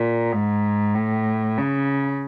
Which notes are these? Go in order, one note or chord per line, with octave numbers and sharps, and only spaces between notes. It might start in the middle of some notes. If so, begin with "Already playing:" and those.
Already playing: A#2
G#2
A2
C#3